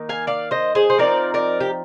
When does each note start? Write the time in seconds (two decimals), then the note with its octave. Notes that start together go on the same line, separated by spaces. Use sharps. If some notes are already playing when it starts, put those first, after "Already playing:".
Already playing: D#3 A#3 D#4
0.09 F5 G#5
0.27 D5 F5
0.51 C5 D#5
0.75 G#4 C5
0.90 C5
0.98 F3 C4 D#4 A#4 D5
1.34 A#4 D5
1.60 G4